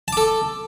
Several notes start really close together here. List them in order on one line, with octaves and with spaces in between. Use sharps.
A5 D6 A4